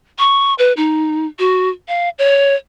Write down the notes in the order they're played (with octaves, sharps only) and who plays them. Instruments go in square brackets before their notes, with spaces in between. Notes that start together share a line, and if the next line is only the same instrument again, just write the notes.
[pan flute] C#6
B4
D#4
F#4
F5
C#5